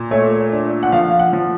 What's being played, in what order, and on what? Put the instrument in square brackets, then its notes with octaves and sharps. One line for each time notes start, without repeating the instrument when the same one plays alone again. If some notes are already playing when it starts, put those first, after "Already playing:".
Already playing: [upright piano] A#2
[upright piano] A3 [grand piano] C#5
[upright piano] D4
[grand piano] F#5
[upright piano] F3 [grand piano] F5
[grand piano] F#5
[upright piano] F3